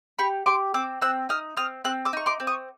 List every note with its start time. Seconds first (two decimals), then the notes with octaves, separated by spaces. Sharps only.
0.19 G4 B5 C#6
0.46 G4 C6 D6
0.74 C4 D6 E6
1.01 C4 E6 F#6
1.29 D#4 D#6 F6
1.57 C4 D#6 F6
1.84 C4 E6 F#6
2.05 D6 E6
2.13 D#4 C#6
2.26 C6 D6
2.40 C4
2.47 C#6 D#6